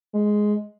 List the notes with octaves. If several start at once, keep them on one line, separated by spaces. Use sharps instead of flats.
G#3